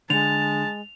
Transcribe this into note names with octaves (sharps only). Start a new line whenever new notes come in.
D3 G#3 A5 F7